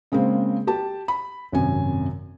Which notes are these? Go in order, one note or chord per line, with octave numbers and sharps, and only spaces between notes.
C#3 G#3 A#3 C4
G4 A5
B5
G#1 F#2 C3 G#5